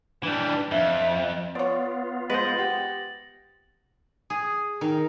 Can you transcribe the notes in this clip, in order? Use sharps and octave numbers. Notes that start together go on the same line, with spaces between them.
E3 G3 D4
F2 E5
B3 F4 C#5 D5
G#3 B4 C5 A6 A#6 F#7
B3 G4
G#4
D#3